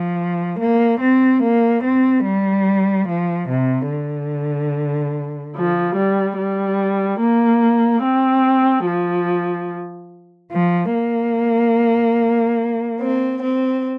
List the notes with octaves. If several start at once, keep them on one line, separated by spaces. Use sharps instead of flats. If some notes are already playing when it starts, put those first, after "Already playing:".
Already playing: F3
A#3
C4
A#3
C4
G3
F3
C3
D3
F3
G3
G3
A#3
C4
F3
F3
A#3
C4
C4